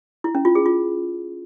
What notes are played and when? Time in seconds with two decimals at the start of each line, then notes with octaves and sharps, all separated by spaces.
0.24 E4
0.35 C#4
0.45 F4
0.55 G#4
0.66 F4